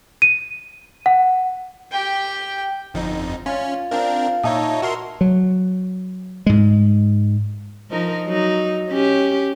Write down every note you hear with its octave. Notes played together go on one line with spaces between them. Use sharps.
D#7
F#5
G4 G5
G1 F2 D#4
C#4 F4
C4 D4 A#4 F5
A#2 D#4 C#5 D#5 E5 A5
F#4 A#4 C6
F#3
G#2 G#3
F3 D#4 A#4
F#3 D#4
C#4 G4